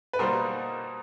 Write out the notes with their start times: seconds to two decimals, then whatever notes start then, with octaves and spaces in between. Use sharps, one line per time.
0.13 B4
0.19 B2 G3 A#3 A#4 C5